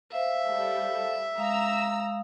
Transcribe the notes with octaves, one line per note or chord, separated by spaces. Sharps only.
C5 E5 F5
G3 A4
G#3 F5 A#5 D#6 E6